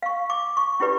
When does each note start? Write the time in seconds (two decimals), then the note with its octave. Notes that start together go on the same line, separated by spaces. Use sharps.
0.02 F5 C#6
0.30 D6
0.57 C#6
0.80 C#4 E4 F4 G4 B4 D5